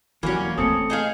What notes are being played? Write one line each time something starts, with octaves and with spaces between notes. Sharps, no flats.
F2 E3 F#3 G3 A#3 C#4 B5
E3 A3 C4 A4 D#6 C#7
D#4 G#4 F5